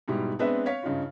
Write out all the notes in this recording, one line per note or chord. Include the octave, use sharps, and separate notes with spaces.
G#2 B2 G3 E4
G#3 B3 C4 D4 B4 E5
C#5 F5 B6
G2 C#3 D#4 F4